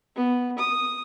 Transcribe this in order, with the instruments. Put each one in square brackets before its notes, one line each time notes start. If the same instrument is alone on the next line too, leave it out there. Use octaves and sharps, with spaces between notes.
[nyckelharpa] B3
D#6